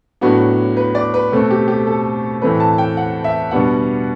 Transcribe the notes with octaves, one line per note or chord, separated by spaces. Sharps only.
A2 F#3 B3 D4 F#4
B4
D5
B4
B2 A3 C4
G4
G4
A4
A2 E3 A3 C4 B4
A5
G5
F#5
E5
B2 G3 B3 D4 F#5